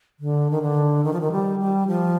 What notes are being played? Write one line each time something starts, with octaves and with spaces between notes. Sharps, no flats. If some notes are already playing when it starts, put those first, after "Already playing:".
D3
D#3
D3
D#3
F3
D#3
G3
G3
F3